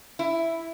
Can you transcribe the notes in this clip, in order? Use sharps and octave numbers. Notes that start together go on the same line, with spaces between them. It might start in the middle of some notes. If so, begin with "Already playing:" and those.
E4